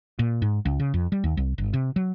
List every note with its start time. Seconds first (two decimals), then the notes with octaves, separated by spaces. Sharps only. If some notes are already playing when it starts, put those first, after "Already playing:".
0.19 A#2
0.42 G#2
0.65 C#2
0.80 C#3
0.94 F2
1.12 G3
1.24 D#2
1.37 C2
1.58 G1
1.74 C3
1.96 F#3